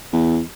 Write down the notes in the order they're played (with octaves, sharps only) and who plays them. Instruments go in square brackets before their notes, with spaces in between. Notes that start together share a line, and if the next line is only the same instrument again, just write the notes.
[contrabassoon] E2